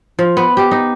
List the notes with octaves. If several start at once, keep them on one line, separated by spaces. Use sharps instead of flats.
F3
B3
G4
D#4